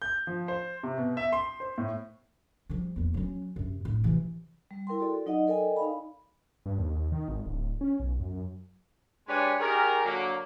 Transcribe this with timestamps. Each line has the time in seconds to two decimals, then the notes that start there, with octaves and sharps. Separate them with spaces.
0.02 G6
0.27 F3
0.48 C5
0.83 C3
0.98 B2
1.17 E5
1.33 C6
1.60 C5
1.78 A2
2.70 F3 G3
2.96 E2 A#3
3.14 F#3 C#4
3.56 F#2 C3
3.85 D1
4.04 C3 E3
4.71 G3
4.87 E4 A#4 G5 C6
5.00 F#4 A4 D5
5.26 F#3 D#4 D5 D#5 F#5
5.47 A4 A#4 D5 D#5 G5 G#5
5.77 D#4 F5 B5
6.66 G2
6.78 D#2
7.12 D#3
7.29 G#1
7.46 D1
7.81 C#4
8.00 B1
8.19 F#2
9.28 G#3 D4 G4 B4 C#5 G#5
9.60 D#3 G4 G#4 A#4
10.05 D3 F#3 A#3